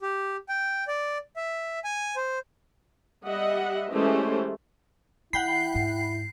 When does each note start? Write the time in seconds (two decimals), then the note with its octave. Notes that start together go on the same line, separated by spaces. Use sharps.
0.02 G4
0.49 G5
0.88 D5
1.36 E5
1.84 G#5
2.16 C5
3.26 G3 D#5 E5 F#5
3.91 E3 G#3 A3 C#4 G4 C5
5.33 D#3 E4 F#5 G5 B5 C7
5.74 D#2 G#2